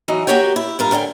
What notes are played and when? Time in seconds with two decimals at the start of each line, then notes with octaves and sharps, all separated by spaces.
0.08 E3 F#3 D#4
0.27 A#3 F#4 G4 C#5 G5
0.56 E4
0.79 G2 F4 A#4
0.91 A2 D3 F5 G5 G#5